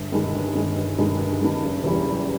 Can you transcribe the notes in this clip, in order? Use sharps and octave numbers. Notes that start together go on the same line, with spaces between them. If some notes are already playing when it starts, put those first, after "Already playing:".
Already playing: G1
G2 D#3 G#3
G1
G2 D#3 G#3
G1
G2 D#3 G#3
G1
G2 D#3 G#3
F#1
E2 C#3 E3 G3
F#1